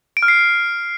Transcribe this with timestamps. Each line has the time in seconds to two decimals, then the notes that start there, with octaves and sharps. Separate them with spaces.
0.17 D7
0.23 F6
0.28 C7